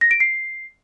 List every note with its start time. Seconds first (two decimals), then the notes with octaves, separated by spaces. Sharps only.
0.01 A#6
0.11 D7
0.20 C7